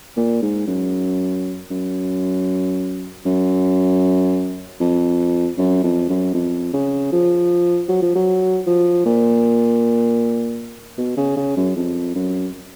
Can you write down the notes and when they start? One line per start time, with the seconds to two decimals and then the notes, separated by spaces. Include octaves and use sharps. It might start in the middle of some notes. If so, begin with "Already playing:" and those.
0.17 A#2
0.42 G#2
0.67 F#2
1.71 F#2
3.26 F#2
4.80 F2
5.58 F#2
5.84 F2
6.09 F#2
6.34 F2
6.73 C#3
7.13 F3
7.89 F#3
8.02 F3
8.15 F#3
8.67 F3
9.05 A#2
10.98 B2
11.17 C#3
11.37 C#3
11.57 F#2
11.76 F2
12.15 F#2